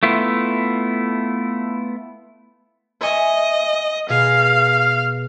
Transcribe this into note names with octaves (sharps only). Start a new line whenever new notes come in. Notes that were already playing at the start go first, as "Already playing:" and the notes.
A3 B3 E4 F4
D#5 E5 G#5 C#6
B2 G#4 A#4 F5